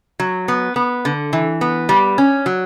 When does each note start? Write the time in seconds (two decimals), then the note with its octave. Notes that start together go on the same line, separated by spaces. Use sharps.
0.20 F#3
0.48 B3
0.76 B3
1.05 D3
1.33 E3
1.61 B3
1.89 G3
2.18 C#4
2.46 F#3